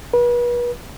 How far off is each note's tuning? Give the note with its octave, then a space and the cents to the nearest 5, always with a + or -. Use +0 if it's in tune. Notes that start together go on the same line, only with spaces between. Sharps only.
B4 -35